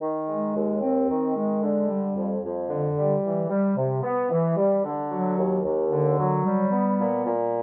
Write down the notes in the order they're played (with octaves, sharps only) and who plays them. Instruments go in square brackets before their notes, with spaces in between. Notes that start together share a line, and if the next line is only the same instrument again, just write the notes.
[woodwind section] D#3
G#3
D#2
C4
D#3
G#3
D3
G3
F2
F2
D3
G3
E3
G3
C3
B3
E3
G3
D3
F#3
D#2
D#2
D3
F#3
G3
B3
A#2
A#2